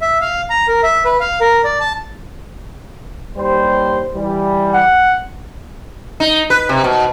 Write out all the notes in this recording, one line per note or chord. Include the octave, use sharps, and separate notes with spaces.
E5
F5
A#5
A#4
E5
B4
F5
A#4
D5
A5
D#2 G3 C5
E3 G3
F#5
D#4
B4
C3
B2